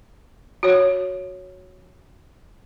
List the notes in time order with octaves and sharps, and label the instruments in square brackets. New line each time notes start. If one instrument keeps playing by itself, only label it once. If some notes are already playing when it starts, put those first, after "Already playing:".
[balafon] F#4 C#5